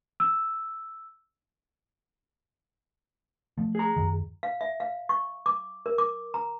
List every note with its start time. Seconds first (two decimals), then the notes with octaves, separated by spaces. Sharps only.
0.20 E6
3.58 F3 A3
3.75 G#4 A#5
3.97 F#2 D#3
4.43 F5
4.61 E5
4.80 F5
5.09 C#6
5.46 D6
5.86 A#4
5.98 D6
6.34 A#5